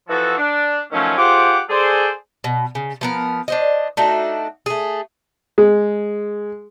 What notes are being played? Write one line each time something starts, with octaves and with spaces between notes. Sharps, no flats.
E3 F3 F#4 A4
D4
D#3 F3 F#3 A3 C#4
F4 G4 G#4 C5 F#5 D6
G#4 A4 C5 D5
B2
C#3
F3 B3 A#4
D4 C5 D#5
A3 D4 D#4 F#4
A3 G#4
G#3